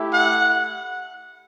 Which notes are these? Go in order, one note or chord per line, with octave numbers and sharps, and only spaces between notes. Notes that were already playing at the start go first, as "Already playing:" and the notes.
Already playing: A3 E4 G4
F#5